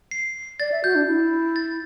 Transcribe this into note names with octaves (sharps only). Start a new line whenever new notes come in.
C7
D5 A6
E5
F#4 G6
D4
E4
A6